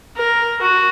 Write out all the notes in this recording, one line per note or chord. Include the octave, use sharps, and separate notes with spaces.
A#4
F#4